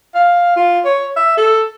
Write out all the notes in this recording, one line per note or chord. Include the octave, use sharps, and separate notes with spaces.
F5
F4
C#5
E5
A4